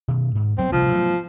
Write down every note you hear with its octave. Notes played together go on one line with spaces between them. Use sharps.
B2 D#3
G#2
D2 F#3 B3 C4
A1 C3 F3 G3
F#3 A3 B3